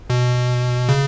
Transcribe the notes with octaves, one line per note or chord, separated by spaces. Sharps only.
B2
C#3